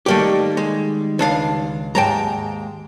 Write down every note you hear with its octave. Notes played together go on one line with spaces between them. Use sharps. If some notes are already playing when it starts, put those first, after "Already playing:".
D#3 G3 A3 A#3 G4 D5
G#3
C#2 D4 F5
D#2 G#2 G#3 G5 A5 A#5